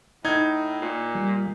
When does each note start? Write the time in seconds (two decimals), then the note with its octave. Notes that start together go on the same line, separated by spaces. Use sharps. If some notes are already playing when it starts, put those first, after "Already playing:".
0.25 A2 D#4 G#6
0.82 A#2
1.15 G3